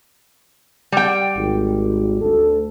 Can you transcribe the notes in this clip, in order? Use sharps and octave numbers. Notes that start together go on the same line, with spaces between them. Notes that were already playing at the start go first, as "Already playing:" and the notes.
G3 G5
G#1
D2 A4